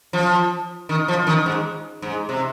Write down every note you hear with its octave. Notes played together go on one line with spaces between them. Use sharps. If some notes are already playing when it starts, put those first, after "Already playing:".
F3
D#3
F3
D#3
G#2
G#2
C3